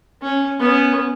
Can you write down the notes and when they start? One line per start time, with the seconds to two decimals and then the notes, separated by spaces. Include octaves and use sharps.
0.22 C#4
0.59 B3 C#4